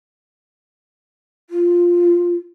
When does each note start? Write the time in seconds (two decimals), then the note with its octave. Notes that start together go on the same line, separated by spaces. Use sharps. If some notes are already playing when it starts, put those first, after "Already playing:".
1.50 F4